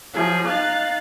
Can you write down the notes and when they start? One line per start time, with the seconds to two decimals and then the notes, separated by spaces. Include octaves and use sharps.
0.13 F3 F#3 G#4
0.48 D#4 F5 F#6 A6